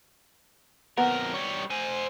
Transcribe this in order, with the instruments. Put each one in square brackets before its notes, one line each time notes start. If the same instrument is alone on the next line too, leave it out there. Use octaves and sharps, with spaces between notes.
[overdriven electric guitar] F2 A#4 [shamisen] B3
[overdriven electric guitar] G3 C#5
C5 G#5